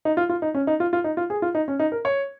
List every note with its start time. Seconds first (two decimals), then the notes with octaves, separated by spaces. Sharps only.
0.05 D#4
0.17 F4
0.29 F4
0.42 D#4
0.54 C#4
0.67 D#4
0.80 F4
0.93 F4
1.04 D#4
1.17 F4
1.30 G#4
1.42 F4
1.55 D#4
1.68 C#4
1.79 D#4
1.92 A#4
2.05 C#5